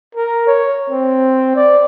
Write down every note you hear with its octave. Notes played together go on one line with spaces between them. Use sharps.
A#4
C#5
C4
D5